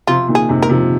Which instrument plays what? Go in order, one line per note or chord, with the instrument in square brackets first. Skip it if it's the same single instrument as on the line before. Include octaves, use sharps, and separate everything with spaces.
[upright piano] C3 F3 [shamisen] F4
[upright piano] A#2 D#3
[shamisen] G#4
[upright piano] G#2 C3
[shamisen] A#4
[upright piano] C3 F3